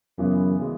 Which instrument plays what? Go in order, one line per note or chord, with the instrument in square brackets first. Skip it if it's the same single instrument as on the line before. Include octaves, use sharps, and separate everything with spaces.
[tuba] F#2 [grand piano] C#3 E3 G#3 B3
[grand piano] C#3 E3 G#3